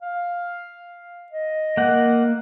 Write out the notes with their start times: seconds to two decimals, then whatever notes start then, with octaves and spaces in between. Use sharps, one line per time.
0.02 F5
1.32 D#5
1.77 A#3 F#5